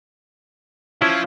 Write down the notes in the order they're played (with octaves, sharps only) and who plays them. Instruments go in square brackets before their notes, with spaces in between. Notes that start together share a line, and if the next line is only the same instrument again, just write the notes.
[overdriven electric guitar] F3 [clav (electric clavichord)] C#4 E4